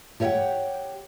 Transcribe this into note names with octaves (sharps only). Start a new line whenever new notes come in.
G4 C#5 D#5 E5 F#5 G5